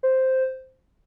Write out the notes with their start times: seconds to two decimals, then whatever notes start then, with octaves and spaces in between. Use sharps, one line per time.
0.03 C5